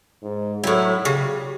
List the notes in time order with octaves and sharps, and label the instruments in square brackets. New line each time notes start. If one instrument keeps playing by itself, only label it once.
[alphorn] G#2
[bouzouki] A2 E4 [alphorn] F#3
[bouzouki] C#3 [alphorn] G4